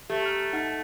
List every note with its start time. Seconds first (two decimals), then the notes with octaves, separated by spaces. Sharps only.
0.10 A3 G4
0.22 A#5 F6
0.53 D#4 F#5